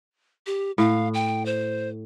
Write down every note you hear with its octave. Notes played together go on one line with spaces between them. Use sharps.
G4
A2 F5
G5
C5